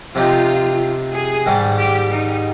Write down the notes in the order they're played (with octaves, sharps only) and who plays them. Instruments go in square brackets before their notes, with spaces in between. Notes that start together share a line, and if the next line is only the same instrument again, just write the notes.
[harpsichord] C3 F3 C4 D#4 G4 [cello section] F4
[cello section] G#4
[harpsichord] G#2 D#3 G3
[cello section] G4
D#4